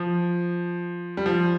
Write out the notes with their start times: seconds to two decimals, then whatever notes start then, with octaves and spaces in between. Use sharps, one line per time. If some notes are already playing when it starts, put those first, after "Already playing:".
Already playing: F3
1.17 G3
1.26 F3